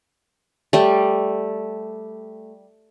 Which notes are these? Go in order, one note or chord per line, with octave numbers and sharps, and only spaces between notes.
G3 A3